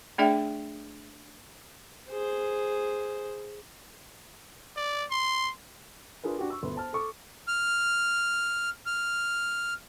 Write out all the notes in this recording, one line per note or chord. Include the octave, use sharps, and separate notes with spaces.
A3 D4 G#4 D5 E5 G5
G#4 C5
D5
C6
D4 F4 G#4 A#4 B4
D4 F#4 G4
C#6 E6
G1 D2 B3 C6
C5 A5 F6
A4 C#6 D6
F6
F6